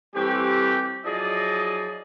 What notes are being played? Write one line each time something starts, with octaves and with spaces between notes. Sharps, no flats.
E3 G3 A3 C4 G4
F3 F#3 E4 G#4 D5 D#5